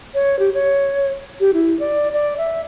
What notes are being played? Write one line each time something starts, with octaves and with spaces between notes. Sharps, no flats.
C#5
G4
C#5
G4
E4
D5
D5
E5